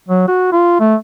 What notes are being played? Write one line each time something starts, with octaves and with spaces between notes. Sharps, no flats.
F#3
F#4
F4
A3